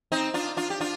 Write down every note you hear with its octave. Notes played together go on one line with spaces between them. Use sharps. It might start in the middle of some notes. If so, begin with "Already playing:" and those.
C4 D#4
D4 F4
D4 F4
G4
D4 F4